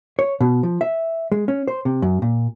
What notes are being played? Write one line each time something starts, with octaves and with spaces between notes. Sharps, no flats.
C#5
B2
F3
E5
G#3
C#4
C5
C3
F#2
A#2